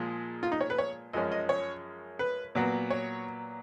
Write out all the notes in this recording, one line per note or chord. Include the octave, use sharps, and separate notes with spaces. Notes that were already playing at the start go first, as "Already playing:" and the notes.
Already playing: A#2 F3 G#3
F4
D#4
C#5
B4
C#5
F#2 F3 G#3 C#4 D#5
D#5
C#5
B4
A#2 F#3 B3
C#5